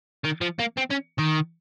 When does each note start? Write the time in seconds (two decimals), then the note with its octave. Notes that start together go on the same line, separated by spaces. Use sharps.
0.24 D#3
0.41 F3
0.59 A#3
0.78 C4
0.91 C#4
1.19 D#3